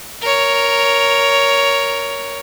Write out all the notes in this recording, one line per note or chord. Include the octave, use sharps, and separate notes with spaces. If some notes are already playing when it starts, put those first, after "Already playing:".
A#4 C#5